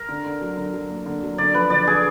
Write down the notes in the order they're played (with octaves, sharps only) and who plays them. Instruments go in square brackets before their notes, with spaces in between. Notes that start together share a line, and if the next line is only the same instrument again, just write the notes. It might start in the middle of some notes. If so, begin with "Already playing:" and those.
Already playing: [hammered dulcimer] A#4
[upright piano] D3
D3
F#3
D3
F#3
A#3
D3
F#3
[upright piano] D3 [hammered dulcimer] D5
[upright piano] F3 [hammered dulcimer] B4
[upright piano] D3 [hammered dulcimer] D5
[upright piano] D3 [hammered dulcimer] G#4